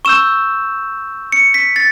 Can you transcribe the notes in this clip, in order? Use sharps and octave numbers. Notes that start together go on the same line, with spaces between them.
C#6 E6 G6 E7
C#7
B6
A6